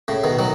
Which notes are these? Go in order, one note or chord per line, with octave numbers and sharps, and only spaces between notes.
A2 C#3
B2 D#3
D#3 F#3